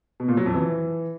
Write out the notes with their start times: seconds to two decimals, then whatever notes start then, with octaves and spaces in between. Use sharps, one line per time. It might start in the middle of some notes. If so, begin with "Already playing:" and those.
0.20 B2
0.28 A#2
0.37 F#3
0.46 F2
0.55 E3